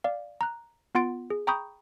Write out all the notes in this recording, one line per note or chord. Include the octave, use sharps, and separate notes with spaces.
D5 F5
A#5 F#6
B3 F4 F#5 C6 A6 D7
G#4
G5 A#5 B5 C#6 D#6 G6